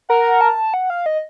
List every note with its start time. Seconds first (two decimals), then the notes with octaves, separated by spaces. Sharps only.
0.09 A#4 F#5
0.41 A5
0.74 F#5
0.90 F5
1.06 D#5